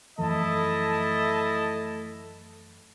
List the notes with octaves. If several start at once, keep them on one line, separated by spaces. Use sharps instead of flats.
F#2 E3 F3 A3 E4 D#5 A5